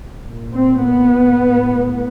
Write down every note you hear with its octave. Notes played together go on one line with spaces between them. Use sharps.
A#2
C4
B3
A2